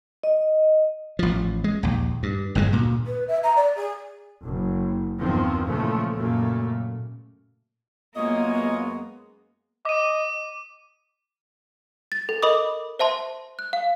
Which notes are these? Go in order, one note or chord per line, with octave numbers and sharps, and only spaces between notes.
D#5
A1 F3
G#3
A#1 D#2
G2
G1 G2 C#3 G#3
D2 A#2
B4
E5
A#5
D5
G#4
F#1
E2 G2 D#3 F3 C4
A#2 C#3 E3 F3 G#3 A3
F#2 A#2 C#3 A3 A#3
F#2 G#3 A#3 B3 F4 C#5 D#5
D#5 D6 D#7
A6
A4
A#4 D#5 B5 D6 D#6
C5 E5 A5 C6
F#6
F5